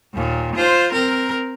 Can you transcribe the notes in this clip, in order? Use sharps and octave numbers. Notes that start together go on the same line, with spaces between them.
D#2 A#2
F4 C5
C4 A#4